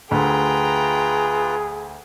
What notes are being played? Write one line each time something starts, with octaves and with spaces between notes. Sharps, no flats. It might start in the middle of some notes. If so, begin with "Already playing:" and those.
D2 F4 G#4 B4 G5 A#5